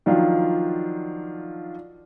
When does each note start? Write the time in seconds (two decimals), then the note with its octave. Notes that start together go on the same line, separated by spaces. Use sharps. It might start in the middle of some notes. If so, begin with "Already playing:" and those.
0.06 D#3 F3 F#3 D4 F4